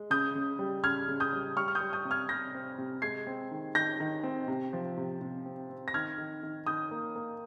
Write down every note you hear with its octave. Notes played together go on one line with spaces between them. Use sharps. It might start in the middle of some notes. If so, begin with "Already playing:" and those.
Already playing: G#3
C#3 D#6 G6
C#3
G3
C#3 F6 G#6
C#3
D#6 G6
G3
G3 C#6 F6
F6
D#6 G6
G3
D#6 G6
C3
F6 G#6
C3 G6 A#6
C4
C3
G#3 G#6 C7
C4
D#3
D#3 G6 A#6
D#3
C4
C3
F3
C3
C3
C4
C4
A#6
D#3 F6 G#6
D#3
D#3
D#3 D#6 G6
A#3
A#3